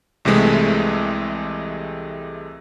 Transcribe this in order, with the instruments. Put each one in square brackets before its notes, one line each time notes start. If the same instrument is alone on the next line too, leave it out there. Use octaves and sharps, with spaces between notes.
[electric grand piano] C2 C3 E3 G#3 A3